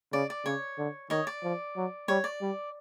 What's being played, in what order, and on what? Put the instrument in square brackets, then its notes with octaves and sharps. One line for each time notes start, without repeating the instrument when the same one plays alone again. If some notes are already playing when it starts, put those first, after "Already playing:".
[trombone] C#3 [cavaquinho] D5
[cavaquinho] D5
[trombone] C#3 [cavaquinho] C#5
[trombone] D3
[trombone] D#3 [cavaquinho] C#5 D#5
[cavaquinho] D5
[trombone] F3
F#3
[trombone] G3 [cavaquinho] C#5
[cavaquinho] D5
[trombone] G3